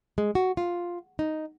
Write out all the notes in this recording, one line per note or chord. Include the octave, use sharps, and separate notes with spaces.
G#3
F#4
F4
D#4